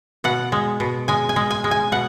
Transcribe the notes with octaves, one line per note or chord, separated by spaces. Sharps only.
B2 F#5
G#3
B2
G#3 G#5
G#5
G#3
G#5
G#3
G#5
B2 F#5